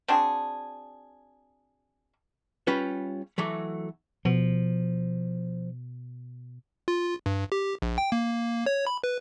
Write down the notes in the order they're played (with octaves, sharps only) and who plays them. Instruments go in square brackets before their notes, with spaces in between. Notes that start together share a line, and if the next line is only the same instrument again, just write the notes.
[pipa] C4 D4 F#4 G#4
[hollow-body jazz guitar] G3 C#4 F4 B4
E3 F#3 A3
[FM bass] B2 [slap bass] F3
[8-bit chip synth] F4
G2
G4
A#1
G5
A#3
C#5
B5
B4